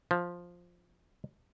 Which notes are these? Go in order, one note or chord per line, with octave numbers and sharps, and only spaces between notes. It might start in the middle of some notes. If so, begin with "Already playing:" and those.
F3